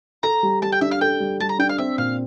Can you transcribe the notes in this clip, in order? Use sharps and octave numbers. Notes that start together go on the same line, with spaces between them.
A4 A#5
G3
G3 A5
G5
D4 E5
F5
A4 G5
G3
G3 A5
A#5
D4 G5
F5
C4 E5
A#2 F5